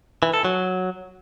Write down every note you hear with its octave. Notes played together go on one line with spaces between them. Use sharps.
E3
A4
F#3